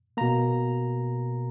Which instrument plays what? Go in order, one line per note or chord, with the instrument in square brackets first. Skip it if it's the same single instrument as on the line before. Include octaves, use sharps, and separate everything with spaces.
[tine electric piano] B2 A#3 A#5